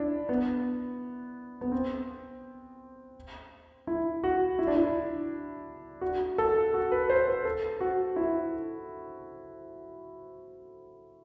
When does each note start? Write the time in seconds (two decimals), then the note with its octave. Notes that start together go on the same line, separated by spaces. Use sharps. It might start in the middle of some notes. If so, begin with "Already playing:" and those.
Already playing: D4 E4
0.29 B3
1.61 B3
1.72 C4
3.87 E4
4.24 F#4
4.59 E4
4.67 D4
4.76 E4
6.01 F#4
6.38 A4
6.74 F#4
6.91 B4
7.10 C5
7.28 B4
7.45 A4
7.81 F#4
8.16 E4